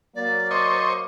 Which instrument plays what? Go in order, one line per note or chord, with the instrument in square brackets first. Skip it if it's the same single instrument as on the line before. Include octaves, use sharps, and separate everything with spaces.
[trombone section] F#3 A#3 [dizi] D5
[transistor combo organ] C5 D#5 C#6 [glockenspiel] D6